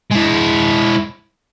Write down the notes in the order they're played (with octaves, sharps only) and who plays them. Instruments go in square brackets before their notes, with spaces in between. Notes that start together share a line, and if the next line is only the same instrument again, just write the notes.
[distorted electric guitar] G#3 E4